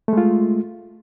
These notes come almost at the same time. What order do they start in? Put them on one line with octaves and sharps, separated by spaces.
A3 G#3 F4